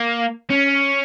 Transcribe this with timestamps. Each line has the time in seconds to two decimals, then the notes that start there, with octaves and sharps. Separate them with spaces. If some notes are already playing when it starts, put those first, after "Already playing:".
Already playing: A#3
0.50 C#4